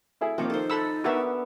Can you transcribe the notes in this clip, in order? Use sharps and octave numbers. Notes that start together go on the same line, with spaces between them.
A3 E4 G#4
C3 D#3 F3 A#3 C5 C#5 D6
D#4 A4 C5
A4 F#5 B5 E6
B3 D4 F#4 A#4 E5